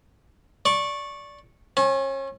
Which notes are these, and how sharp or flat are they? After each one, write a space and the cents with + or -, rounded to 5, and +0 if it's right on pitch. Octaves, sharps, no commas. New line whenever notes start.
D5 -10 C#6 -15
C#4 -35 G#5 +35